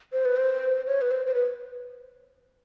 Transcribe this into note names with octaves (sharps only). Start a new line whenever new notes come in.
C5
B4
C5
C#5
B4
C5
C5
B4